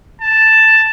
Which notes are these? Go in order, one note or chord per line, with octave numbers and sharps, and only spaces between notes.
A5